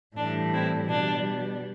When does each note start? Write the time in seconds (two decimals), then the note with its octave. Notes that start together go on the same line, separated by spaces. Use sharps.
0.16 A2 E3 G3 D4
0.52 C4 E4
0.89 B2 G3 D4